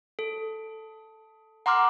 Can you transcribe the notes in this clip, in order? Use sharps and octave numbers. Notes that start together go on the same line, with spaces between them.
A4
F#5 A#5 C6 D6 F6